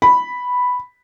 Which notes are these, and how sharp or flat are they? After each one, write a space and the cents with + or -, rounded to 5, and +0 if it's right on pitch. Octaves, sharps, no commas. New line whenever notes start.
B5 +0